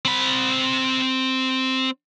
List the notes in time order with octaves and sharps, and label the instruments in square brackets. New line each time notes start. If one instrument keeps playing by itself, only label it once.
[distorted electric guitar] C4 B5